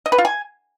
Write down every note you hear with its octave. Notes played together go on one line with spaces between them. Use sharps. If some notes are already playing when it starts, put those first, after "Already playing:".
D#5
B4
F4
G#5